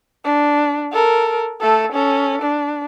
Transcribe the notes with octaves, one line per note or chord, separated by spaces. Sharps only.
D4
A4 A#4
A3 A4
C#4 A4
D4